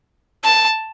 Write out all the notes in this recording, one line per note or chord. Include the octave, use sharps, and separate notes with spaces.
A5